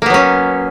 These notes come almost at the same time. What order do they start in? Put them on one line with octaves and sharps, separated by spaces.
A#3 B3 F#3 C#4